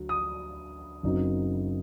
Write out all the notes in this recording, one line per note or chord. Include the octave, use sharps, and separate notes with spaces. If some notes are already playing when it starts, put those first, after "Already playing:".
Already playing: D2 F#3
D#6
F#1 F#2 F#3 C4 D#4